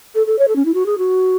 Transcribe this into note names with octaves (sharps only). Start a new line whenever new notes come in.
A4
A4
C#5
A4
C#4
E4
F#4
G#4
F#4